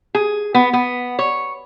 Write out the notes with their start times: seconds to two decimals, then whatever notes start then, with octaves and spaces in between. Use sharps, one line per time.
0.15 G#4
0.54 B3
0.73 B3
1.19 C#5